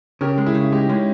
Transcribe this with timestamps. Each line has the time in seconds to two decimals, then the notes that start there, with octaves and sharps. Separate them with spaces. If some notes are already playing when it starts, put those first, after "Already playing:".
0.21 C#3 G4 A#4
0.38 G#3
0.46 E4 G#4
0.55 C#3
0.72 G#3 D#4 G4
0.89 G#3 C#4 E4